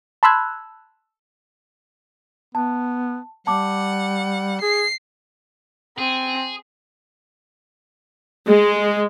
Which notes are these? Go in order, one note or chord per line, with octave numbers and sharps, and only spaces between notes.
A5 B5 C6 E6 F#6 G#6
B3 A5
G3 F#5 A5 D6
G#4 C7
C4 G#4
G#3